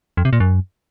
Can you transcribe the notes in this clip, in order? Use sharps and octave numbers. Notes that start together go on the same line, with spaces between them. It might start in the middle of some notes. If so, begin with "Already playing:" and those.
F2
C3
A#2
F#2